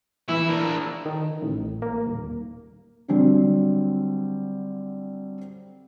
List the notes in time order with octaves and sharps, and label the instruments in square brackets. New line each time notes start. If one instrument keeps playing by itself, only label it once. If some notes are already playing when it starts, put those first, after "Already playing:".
[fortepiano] E3 [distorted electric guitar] E4
[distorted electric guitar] A#3 D4
[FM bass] D#3
A1
A#3
D#1
[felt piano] D3 F#3 G3 C4